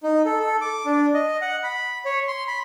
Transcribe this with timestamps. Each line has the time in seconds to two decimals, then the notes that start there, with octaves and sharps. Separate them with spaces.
0.03 D#4
0.25 A4
0.40 A4
0.61 D6
0.86 D4
1.14 D#5
1.42 F#5
1.64 B5
2.05 C#5
2.28 C6
2.48 B5